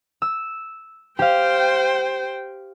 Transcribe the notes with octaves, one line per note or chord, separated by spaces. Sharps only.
E6
G4 C5 F5 G5